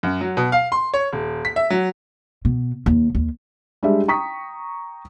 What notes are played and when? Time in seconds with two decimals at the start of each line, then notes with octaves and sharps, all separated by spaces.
0.03 F#2
0.21 F#3
0.37 B2
0.52 F5
0.72 C6
0.94 C#5
1.13 D#1
1.45 B6
1.56 E5
1.70 F#3
2.45 B2
2.86 D#2
3.15 D#2
3.83 G3 G#3 D4 G4 E5
4.08 G5 A#5 C#6 D#6 B6